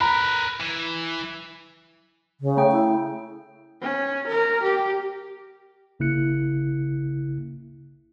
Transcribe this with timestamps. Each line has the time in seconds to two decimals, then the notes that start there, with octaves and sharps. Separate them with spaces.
0.01 A#4 B4 A#5 B5
0.60 E3
2.40 C#3
2.57 A3 G5
2.72 E4
3.82 C#4
4.27 A#4
4.63 G4
5.99 A1 C#3 A#3 E4 F#6 C#7